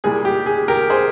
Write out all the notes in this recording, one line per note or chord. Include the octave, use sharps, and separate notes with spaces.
C2 A#2 G3 G#4
G4
G#4
G4 A#4
G#4 C5